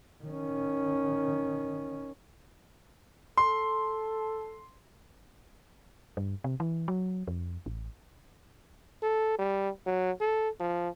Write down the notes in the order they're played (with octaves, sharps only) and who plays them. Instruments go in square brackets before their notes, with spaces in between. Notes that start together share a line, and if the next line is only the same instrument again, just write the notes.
[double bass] D#3 C#4
[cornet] A4 [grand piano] C6
[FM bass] G2
C3
E3
F#3
F2
A1
[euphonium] A4
G3
F#3
A4
F3